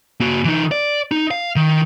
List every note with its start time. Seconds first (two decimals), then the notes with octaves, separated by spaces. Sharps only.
0.21 A#3 F#4
0.45 E3 D#4
0.71 D5
1.11 D#4
1.31 F5
1.56 D#3